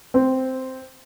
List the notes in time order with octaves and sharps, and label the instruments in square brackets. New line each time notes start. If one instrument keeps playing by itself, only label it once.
[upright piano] C4